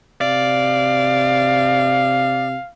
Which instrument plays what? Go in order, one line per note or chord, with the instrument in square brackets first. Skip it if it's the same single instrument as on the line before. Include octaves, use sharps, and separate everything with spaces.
[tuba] C3 [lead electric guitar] D5 [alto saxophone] F5